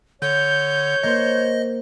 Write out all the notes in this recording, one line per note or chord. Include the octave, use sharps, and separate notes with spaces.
D3 C#5 G6
A#3 C5 D#5